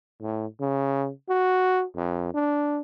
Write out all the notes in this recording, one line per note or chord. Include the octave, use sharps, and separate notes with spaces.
A2
C#3
F#4
F2
D4